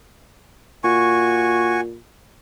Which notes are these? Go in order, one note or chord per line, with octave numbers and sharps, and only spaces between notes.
A#2 F#4 G#5 C#6